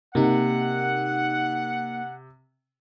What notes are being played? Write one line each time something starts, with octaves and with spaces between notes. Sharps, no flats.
C3 A#3 D#4 F#5